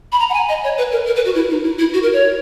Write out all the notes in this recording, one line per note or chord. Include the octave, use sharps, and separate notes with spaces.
B5
A#5
F#5
G#5
D#5
C#5
B4
A#4
A#4
B4
F#4
E4
D#4
E4
E4
F#4
A#4
C#5